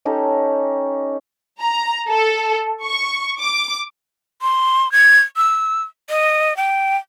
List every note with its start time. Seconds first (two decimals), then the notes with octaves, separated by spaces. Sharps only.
0.05 C#4 D#4 G4 A4
1.60 A#5
2.09 A4
2.82 C#6
3.39 D6
4.42 C6
4.92 G#6
5.36 E6
6.09 D#5
6.57 G5